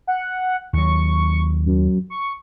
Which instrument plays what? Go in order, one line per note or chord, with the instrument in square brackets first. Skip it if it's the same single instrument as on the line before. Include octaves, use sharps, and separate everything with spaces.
[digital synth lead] F#5
[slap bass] D#2 F#3 [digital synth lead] C#6
[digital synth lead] F#2
C#6